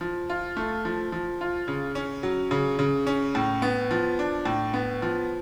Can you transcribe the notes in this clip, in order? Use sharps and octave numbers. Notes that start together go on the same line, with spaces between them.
F3
F4
A3
F3
F3
F4
C#3
C#4
F#3
C#3
C#3
C#4
A2
B3
F3
D4
A2
B3
F3